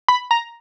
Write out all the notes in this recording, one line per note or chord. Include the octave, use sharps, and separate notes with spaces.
B5
A#5